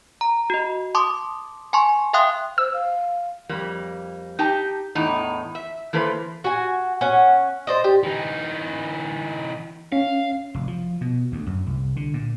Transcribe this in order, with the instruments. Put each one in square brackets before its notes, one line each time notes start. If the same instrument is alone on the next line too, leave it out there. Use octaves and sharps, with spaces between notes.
[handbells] A#5
F#4 D#5
A5 C6 D6 D#6
G#5 A5 C6 C#6
E5 F5 G5 C6 D#6 F#6
[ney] C5 [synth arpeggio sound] E6
[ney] F5
[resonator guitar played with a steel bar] F2 G3 A#3
D#4 G4 G5 A5
E2 A2 D#4
E5
E3 A#3 A4 B4 C5
[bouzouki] F#4 G#5
C#4 F#5
C5 D5 D#5
G4
[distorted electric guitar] E3 D#4
[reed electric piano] C#4 [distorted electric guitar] F5
[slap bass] F1
F3
B2
D2
F#2
C2
D3
A#2